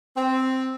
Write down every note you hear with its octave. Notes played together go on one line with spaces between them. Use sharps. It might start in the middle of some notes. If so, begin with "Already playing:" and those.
C4